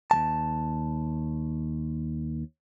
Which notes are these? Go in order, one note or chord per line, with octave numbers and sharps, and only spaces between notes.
D#2 F#3 A5